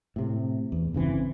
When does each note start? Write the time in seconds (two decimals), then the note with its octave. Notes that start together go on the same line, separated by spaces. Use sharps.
0.16 A2 C3
0.72 E2
0.94 G1 C#3 E3 C4